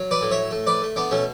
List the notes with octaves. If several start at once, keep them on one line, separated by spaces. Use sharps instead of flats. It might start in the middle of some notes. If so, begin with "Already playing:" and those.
Already playing: F#3
B4 D5
A2
C#5 E5
A3
B4 D5
A3
B3 D4
B2 A3 C#4